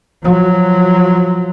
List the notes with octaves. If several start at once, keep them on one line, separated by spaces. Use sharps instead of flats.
F3 F#3